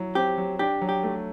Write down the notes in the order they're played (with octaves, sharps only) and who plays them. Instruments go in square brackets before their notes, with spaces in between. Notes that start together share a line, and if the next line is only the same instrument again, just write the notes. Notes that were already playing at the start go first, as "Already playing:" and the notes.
Already playing: [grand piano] F#3 E4
[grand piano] C4 [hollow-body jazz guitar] G4
[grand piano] F#3
[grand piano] D4 [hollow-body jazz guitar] G4
[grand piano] F#3
[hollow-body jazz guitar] G4
[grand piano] A3